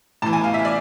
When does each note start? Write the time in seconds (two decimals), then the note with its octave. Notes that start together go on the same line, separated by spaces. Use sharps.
0.22 A2 E3 A5
0.33 G#5
0.44 F5
0.54 E5
0.65 D5